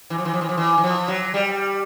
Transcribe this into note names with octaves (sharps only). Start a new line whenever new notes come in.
E3
F3
E3
F3
E3
F3
E3
E3
F3
F#3
G3